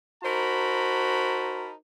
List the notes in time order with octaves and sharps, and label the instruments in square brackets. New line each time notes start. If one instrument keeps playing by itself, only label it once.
[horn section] D#4 F#4 A#4 C5 A5 B5